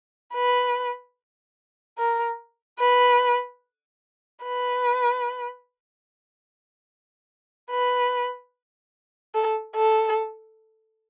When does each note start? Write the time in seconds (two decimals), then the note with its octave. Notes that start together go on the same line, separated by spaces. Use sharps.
0.34 B4
1.98 A#4
2.80 B4
4.44 B4
7.71 B4
9.35 A4
9.76 A4